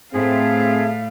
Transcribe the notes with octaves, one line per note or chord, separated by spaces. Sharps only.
A2 A3 C4 G#4 F5